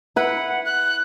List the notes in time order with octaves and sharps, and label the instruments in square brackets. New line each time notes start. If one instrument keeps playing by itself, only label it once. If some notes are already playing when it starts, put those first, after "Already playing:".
[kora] E4 B4 [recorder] F#5
[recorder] F#6